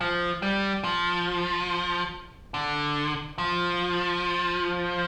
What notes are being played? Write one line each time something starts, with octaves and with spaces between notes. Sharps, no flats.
F3
G3
F3
D3
F3